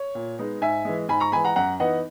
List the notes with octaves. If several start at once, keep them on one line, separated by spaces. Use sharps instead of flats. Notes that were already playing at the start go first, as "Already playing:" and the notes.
Already playing: C#5
A#2
G#3 B3 D#4
G#2 E5 G#5
E3 G#3
G#2 G#5 B5
A#5 C#6
E3 G#3 G#5 B5
F#5 A#5
F#2 F#5 A#5
E3 B3 D#4 D#5 F#5